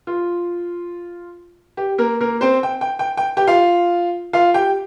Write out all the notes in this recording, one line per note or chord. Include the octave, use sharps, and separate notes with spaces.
F4
G4
A#3 A#4
A#3 A#4
C4 C5
G5
G5
G5
G5
G4 G5
F4 F5
F4 F5
G4 G5